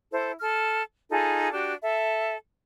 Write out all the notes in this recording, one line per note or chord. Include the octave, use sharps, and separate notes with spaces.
E4 A4 C5
A4 F6
D#4 F4 G#4 A4
D4 F#4 G4
A4 E5